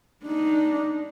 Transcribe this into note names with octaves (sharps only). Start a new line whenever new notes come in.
D4 D#4